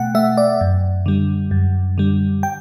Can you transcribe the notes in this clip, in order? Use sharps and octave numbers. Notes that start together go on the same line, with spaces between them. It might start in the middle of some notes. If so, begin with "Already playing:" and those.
Already playing: B2 A3 F#5 G5
A3 E5
D5
F#2
D3 G3
F#2
D3 G3
G5